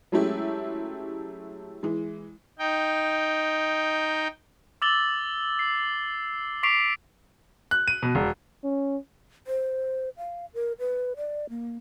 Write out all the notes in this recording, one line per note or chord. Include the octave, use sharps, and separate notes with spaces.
F#3 G#3 A3 C#4 E4 G4
E3 G#3
D#4 G5
D6 E6 A6 F#7 G7
C7
C#6 D6 B6 C7 D7 F7
F#6
D#7
B2
E1
C#4
C5
F5
A#4
B4
D5
A#3